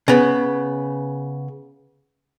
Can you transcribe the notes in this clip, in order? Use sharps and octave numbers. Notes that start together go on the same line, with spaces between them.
C#3 B3